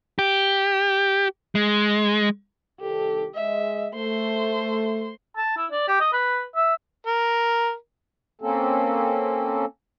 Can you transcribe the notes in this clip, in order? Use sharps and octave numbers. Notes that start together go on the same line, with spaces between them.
G4
G#3
C2 D#3 G4 A4
G#3 D#5 E5
A3 C5 C6
A5
E4
D5
G4
D#5
B4
E5
A#4
A#3 C4 C#4 A4